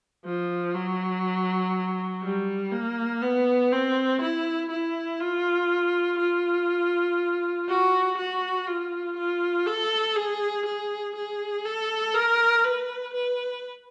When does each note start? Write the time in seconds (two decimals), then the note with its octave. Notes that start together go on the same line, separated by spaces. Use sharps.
0.25 F3
0.75 F#3
2.23 G3
2.72 A#3
3.22 B3
3.72 C4
4.22 E4
4.71 E4
5.20 F4
6.19 F4
7.69 F#4
8.18 F#4
8.67 F4
9.17 F4
9.67 A4
10.16 G#4
10.66 G#4
11.16 G#4
11.65 A4
12.15 A#4
12.64 B4
13.14 B4